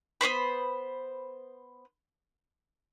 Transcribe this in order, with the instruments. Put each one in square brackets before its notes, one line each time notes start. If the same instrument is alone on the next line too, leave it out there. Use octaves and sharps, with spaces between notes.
[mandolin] B3 C4 C5 B5